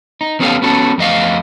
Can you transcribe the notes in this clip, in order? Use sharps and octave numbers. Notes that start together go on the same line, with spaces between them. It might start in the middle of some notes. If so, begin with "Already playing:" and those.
D#4
E2 B3 C#4 G4 A4 F5
B3 C#4 F#4 A4
F2 A3 D#5 F5